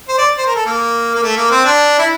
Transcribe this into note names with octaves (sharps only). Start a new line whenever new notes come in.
C5
D5
C5
A#4
A4
A#3
A#3
A3
A#3
C4
D4
E4